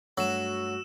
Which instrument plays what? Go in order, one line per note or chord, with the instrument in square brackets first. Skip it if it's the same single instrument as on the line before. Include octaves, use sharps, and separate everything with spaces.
[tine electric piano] G2 A3 [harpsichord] F#3 [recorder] F#4 [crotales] E6 E7